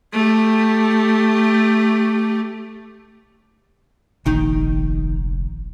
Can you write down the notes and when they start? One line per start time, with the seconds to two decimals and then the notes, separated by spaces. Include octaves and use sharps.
0.13 A3 G4
4.26 F1 A#1 D#3 D#4 G5